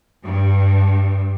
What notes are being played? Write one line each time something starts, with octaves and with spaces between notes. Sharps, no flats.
G2